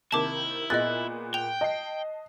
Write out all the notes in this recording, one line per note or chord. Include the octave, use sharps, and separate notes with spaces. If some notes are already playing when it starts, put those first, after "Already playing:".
C3 D#3 A#3 E4 A5 D6
A#2 B3 G#4 D#5 F#6 A6
G5 F7
D#5 A5 C7